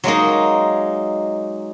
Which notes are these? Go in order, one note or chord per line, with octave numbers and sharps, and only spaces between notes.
F#3 G#3 A#3 D#4